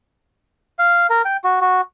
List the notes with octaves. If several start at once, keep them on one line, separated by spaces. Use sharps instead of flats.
F5
A#4
G5
F#4
F#4